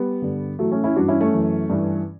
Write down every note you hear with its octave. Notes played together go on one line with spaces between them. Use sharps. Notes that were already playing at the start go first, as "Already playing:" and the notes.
Already playing: G3 B3
G2 D3
A2 E3 F#3 A3
A3 C#4
C#4 E4
G2 E3 D4 F#4
C#4 E4
A3 C#4
F#2 E3
G2 E3